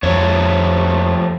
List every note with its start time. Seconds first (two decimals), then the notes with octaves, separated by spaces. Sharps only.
0.03 F2 F3 A3 C#5